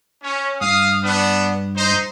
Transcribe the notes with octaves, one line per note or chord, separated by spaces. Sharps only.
C#4
G2 F5 D#6
B3 D4
D#4 C5